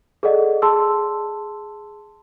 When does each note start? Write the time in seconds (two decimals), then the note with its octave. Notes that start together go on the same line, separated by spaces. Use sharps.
0.23 G#4 A4 D5 D#5 F#5
0.62 G#4 A5 C6 E6